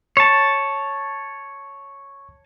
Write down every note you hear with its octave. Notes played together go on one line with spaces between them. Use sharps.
C#5 A5 C#6